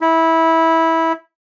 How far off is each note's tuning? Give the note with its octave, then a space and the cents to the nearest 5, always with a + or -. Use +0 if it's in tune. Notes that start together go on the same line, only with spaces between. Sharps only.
E4 -15